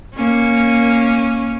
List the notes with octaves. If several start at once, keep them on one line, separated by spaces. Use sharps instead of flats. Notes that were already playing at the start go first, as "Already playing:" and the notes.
A#3 C#4